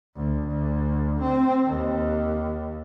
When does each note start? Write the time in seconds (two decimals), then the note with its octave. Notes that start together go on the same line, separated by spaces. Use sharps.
0.16 D2
0.47 D2
1.21 C4
1.67 D#2